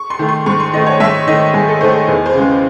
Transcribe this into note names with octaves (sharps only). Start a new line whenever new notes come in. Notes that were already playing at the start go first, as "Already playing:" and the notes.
Already playing: C#6
C6
D#3 A3
C6
G#2 C#6
C6
D#3 A3 D#5
C#5
G#2 E5
D#3 A3 D#5
G#2 G#4
A4
D#3 A3 C5
G#4
E2 G#4
C5
C#3 G#3